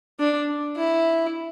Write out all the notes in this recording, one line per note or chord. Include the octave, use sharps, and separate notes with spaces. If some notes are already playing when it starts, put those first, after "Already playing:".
D4
E4